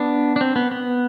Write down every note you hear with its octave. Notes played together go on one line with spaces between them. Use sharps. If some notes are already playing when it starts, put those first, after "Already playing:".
Already playing: B3 D4
D4
C4
B3
B3